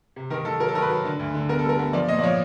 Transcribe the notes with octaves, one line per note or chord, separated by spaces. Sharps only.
C3
D#3 A#4
D#3 A4
F#3 A#4
A4
D#3 A#4
B4
F#3
D3
D2
D3
B3 A#4
A4
G3 A#4
B3
F3 D5
A#2 D#5
D5
F3 C#5